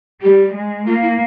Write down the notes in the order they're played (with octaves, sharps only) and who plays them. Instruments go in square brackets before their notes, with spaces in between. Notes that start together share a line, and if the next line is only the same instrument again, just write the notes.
[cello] G3 [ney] G4
[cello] G#3
[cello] A#3 [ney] F4
[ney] E4